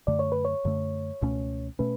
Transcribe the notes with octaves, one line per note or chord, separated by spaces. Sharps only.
F#2 D3 A3 D5
C#5
B4
C#5
F#2 D3 A3
C#2 B2 A3 C#4
B2 A3 C#4 B4